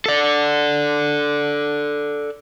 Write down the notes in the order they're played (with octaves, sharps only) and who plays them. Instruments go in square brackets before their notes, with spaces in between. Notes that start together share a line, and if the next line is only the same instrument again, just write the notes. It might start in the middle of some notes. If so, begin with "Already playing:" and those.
[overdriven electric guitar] A4 D5